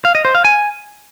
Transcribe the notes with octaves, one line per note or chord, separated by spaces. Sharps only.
F5
D#5
C5
F5
G#5